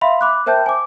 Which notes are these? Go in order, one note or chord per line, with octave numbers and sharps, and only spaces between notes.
E5 F5 B5 C6
B5 D6 F#6
A#4 C5 E5 G5 A5 G6
G#5 D6